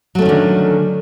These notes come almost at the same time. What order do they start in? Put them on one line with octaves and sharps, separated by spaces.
F#3 A3 C#4 D#3 D3